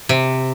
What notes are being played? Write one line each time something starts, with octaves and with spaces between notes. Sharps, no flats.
C3